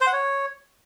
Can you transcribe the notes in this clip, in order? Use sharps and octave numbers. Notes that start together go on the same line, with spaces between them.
C5
F#5
C#5